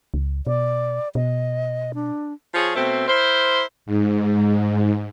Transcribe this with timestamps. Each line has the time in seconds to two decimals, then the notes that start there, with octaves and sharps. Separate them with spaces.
0.14 C#2
0.47 B2 D5
1.15 B2 D#5
1.95 D4
2.54 F3 G#4 C#5
2.76 B2 A3 C4
3.08 E4 A#4 C5
3.86 G#2